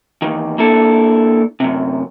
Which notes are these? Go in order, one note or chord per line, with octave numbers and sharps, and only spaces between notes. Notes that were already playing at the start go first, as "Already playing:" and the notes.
E2 D#3
A#3 D4 E4 A4
F#2 C3